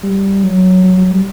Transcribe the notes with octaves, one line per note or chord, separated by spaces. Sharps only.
G3
F#3
F#3
F#3
G3